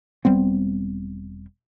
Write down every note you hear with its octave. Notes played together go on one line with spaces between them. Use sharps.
E1 G3 B3 C4